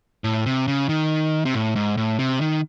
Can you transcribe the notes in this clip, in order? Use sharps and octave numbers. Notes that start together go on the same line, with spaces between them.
A2
C3
C#3
D#3
C3
A2
G#2
A2
C3
D#3